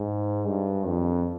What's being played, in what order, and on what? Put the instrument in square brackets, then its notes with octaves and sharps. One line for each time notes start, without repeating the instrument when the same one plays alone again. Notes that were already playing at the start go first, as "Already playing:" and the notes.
Already playing: [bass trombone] G#2
G2
F2